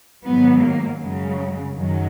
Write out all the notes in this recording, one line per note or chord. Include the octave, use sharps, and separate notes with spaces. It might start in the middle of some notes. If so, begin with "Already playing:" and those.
G#2 D#3 F#3 B3
A#3
F#2 C#3 F#3 G#3
F#2 D#3 F#3 G#3